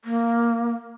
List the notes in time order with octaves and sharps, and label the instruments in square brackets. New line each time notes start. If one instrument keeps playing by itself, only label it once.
[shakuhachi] A#3